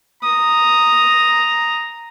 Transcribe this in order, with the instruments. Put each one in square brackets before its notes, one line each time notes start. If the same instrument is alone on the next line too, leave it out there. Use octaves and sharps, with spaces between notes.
[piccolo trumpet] A#5 [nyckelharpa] D#6